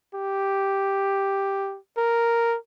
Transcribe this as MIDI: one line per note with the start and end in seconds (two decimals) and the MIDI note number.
0.15 1.78 67
1.98 2.56 70